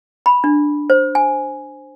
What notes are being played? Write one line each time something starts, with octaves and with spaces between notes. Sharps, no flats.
B5
D4
C5
G#5